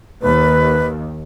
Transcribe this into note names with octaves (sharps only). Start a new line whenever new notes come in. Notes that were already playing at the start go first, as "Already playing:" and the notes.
D#2 B4